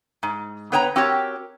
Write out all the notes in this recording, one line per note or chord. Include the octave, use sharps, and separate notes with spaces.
G#2
B3 B4 C#5 G5 A5 A#5
C4 F#4 G4 A#4 C#5